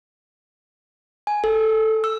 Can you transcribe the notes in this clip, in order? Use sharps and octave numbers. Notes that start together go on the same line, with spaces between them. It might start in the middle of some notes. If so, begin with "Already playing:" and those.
G#5
A4
E6